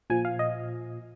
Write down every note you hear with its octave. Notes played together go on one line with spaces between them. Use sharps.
A#2 F3 G#5
F5
D#5